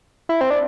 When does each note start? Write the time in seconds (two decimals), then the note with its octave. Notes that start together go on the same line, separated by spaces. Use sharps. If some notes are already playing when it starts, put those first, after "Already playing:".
0.29 E4
0.41 C4
0.50 D4